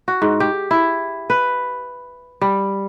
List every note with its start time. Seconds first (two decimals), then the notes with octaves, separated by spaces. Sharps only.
0.08 F#4
0.22 G#2
0.40 G4
0.71 E4
1.30 B4
2.41 G3